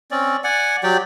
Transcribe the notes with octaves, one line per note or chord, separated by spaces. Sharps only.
C4 C#4 D5
D5 F#5 G#5
F#3 G4 D5 G5